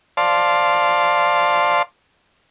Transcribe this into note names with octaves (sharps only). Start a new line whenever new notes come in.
C5 D5 F5 A5 C6